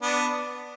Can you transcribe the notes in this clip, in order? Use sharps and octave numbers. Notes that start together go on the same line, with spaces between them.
B3 D4